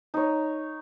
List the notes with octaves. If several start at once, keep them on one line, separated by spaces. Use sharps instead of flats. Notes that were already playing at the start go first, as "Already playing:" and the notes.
D#4 C#5